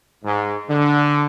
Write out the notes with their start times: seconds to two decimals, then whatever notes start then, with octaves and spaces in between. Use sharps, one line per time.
0.24 G#2
0.69 D3